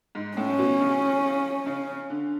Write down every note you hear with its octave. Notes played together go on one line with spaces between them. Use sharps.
G#2
A2 C#4
B2
C#3
C#3
D3